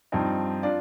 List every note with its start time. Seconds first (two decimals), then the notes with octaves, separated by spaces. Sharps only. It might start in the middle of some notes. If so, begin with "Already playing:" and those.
0.12 G2 F3 C4 D#4
0.63 D4 F4 D5